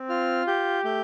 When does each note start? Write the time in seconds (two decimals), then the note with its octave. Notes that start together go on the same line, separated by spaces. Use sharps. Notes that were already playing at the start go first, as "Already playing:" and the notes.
Already playing: C4
0.09 F4 F6
0.47 G4 G6
0.84 A3 G6